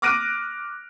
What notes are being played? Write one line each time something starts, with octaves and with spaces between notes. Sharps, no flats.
D6 F6 F#6 A#6 D7 D#7